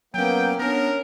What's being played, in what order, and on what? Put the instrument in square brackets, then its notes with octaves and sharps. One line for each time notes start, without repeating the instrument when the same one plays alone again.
[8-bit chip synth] F#3 C#4 [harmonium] A#3 B3 [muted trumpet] G5
[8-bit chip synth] B3 D4 [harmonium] C#4 [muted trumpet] A#4